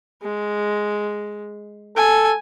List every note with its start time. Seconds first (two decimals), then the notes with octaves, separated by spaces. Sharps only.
0.23 G#3
1.97 A4 G#5